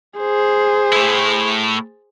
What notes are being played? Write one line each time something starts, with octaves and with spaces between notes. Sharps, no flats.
G#4 C5
A2 E4